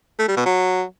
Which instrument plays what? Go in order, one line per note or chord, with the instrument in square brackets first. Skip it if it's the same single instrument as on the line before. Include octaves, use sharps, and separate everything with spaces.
[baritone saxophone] A3
G3
B2
F#3